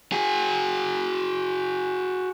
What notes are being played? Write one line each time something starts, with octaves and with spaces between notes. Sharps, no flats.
F#4 G#4